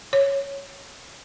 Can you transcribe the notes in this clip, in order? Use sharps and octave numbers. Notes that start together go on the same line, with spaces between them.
C#5